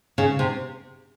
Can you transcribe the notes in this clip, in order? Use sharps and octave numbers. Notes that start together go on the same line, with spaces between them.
C#3
C3